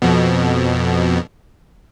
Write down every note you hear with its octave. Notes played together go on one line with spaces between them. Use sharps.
F2 B2